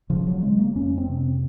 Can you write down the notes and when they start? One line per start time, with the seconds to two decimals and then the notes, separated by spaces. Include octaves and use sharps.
0.10 C#3 F3
0.27 F#3
0.42 C#3 G#3
0.59 A#3
0.75 F2 C#4
0.98 C4
1.09 C3